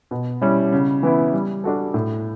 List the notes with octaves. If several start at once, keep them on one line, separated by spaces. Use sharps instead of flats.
B2
G3 C#4 E4
C#3
E3 B3 E4
G3
D4 F#4 A4
A2